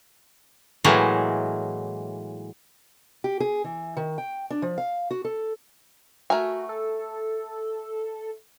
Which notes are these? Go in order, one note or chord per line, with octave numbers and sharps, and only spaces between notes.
A2 E3 F#3 G#3 A#3
G4
G#4
E3
D#3
G5
D4
F3
F5
F#4
A4
A3 F#4 A#4 G#5
A4